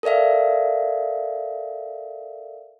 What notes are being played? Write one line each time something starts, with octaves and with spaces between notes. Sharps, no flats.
A4 A#4 D5 E5 F5